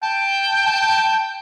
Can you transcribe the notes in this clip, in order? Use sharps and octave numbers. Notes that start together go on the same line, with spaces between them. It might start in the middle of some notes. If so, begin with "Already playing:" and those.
G5 A5
A5